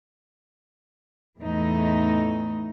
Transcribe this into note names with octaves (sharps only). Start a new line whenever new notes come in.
E2 A2 E3 A3 D#4